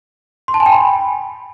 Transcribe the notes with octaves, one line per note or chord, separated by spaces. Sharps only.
C6
A5
G#5
G5
B5